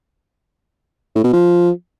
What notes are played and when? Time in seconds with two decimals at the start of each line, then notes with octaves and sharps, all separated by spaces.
1.15 A2
1.24 B2
1.33 F3